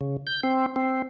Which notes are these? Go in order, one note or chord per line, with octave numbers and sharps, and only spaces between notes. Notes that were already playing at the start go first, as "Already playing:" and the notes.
C#3
G6
C4
C4